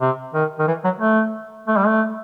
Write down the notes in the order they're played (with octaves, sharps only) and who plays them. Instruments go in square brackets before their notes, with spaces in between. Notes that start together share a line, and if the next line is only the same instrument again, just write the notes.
[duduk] C3
D#3
D#3
E3
F#3
A3
A3
G3
A3